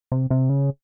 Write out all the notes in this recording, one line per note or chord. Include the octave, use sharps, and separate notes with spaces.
C3
C3
C#3